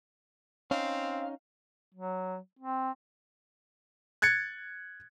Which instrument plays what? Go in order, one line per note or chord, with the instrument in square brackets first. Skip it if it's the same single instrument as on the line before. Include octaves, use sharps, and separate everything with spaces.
[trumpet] C4 [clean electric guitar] C#4 D#4 [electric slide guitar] F5
[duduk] F#3
C4
[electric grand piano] F#6 G#6 A6 C#7